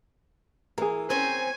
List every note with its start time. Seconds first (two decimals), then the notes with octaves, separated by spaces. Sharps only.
0.78 E3 G#4 A#4
1.10 C4 C#4 C5 G#5